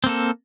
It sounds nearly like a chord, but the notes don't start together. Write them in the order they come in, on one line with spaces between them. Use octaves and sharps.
C4 A#3 A4